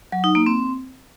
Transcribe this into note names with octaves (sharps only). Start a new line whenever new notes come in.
F#3
D#4
A#3
C4